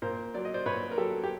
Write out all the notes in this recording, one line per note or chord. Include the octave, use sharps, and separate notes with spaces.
A#2 A#4 C5
F#3 D5
D#5
C5 D5
A#2 B4 C#5
A#4
F#3 G4 A4
G4